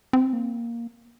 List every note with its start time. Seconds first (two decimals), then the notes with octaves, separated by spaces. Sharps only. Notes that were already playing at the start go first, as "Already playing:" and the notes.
0.13 C4
0.33 A#3